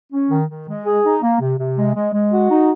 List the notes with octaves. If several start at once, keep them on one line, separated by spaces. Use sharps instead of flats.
C#4
D#3
D#3
G#3
G#4
D#4
A#3
C3
C3
G#3
G#3
G#3
F#4
D#4